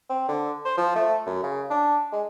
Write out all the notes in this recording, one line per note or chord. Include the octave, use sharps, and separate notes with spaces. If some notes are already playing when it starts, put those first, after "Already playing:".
C4
D3
C5
F3
A3
F#2
C#3
D4
G#3